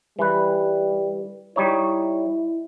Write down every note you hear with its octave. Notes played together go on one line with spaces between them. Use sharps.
E3 G3 B4
G3 D#4 E4 C#5